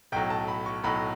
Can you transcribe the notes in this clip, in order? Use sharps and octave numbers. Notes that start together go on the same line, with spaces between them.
B1 A2 F#3 G5
A5
B5
C#6
B1 A2 F#3 B5